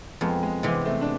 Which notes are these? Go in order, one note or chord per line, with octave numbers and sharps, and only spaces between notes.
F2 G#3 B3
G#3
C3 E3 G#3 B3
A3 C4
D4